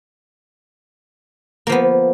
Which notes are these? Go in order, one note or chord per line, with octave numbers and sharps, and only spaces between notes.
F3 A#3 B3